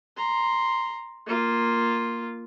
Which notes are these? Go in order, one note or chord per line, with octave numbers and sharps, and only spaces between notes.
A#5 C6
A#3 F4